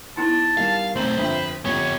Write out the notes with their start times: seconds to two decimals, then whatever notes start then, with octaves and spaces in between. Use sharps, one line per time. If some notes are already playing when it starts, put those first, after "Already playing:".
0.17 B3 D#4 E4 A5
0.57 D#3 G3 F5
0.96 B1 A3 C4 C5 A#5 F#7
1.18 G1 F2 D4 B4 E5 G5
1.65 F2 B3 G4 C#5